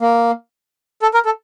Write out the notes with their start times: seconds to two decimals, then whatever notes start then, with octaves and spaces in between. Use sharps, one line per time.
0.01 A#3
1.02 A4
1.14 A#4
1.25 A4